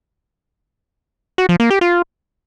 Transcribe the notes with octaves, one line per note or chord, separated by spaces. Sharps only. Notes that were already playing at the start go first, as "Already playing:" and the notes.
F#4
F3
A#3
G4
F4